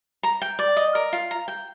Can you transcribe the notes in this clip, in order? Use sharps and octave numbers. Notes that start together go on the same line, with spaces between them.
A#5
G5
D5
D#5
A#4
F4
A#5
G5